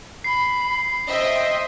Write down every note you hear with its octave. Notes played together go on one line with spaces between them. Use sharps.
B5 C7
C5 D#5 E5 G5